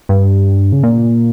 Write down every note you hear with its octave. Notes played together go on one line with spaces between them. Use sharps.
G2
C#3
A#2